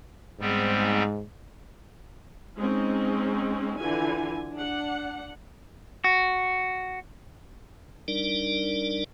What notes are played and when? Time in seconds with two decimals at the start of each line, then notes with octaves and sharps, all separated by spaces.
0.41 G#2 G3 B3 C4
2.58 G#3 C4 C#4 D#4
3.79 D3 E3 F4 G#5
4.55 D4 F#5
6.04 F#4
8.08 G3 D4 D#4 A#4 D5